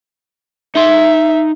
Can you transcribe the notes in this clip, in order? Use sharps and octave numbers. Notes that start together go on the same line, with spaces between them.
D#4 E5 C6